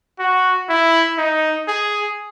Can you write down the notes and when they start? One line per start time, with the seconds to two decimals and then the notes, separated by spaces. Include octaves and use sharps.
0.19 F#4
0.70 E4
1.18 D#4
1.68 G#4